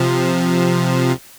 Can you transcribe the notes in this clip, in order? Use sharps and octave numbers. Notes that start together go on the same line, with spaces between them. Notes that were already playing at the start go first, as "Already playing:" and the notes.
Already playing: C3 F3